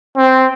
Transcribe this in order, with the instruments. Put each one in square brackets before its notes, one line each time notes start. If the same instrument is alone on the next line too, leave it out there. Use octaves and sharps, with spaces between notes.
[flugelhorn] C4